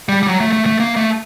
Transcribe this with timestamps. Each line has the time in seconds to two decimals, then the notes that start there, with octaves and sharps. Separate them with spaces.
0.09 G3
0.23 G3
0.27 F#3
0.40 A3
0.53 A3
0.66 A3
0.80 A#3
0.96 A3